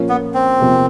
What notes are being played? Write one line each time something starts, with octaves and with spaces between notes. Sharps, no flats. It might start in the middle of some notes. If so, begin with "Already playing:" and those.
Already playing: A#2 F3 A#3 C#4 F4
B3
C4
E2 C3 F3 A#3